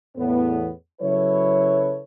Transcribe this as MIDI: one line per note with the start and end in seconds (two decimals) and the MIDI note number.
0.17 0.69 40
0.17 0.69 45
0.17 0.69 59
1.01 2.01 49
1.01 2.01 54
1.01 2.01 64
1.01 2.01 69
1.01 2.01 71
1.01 2.01 73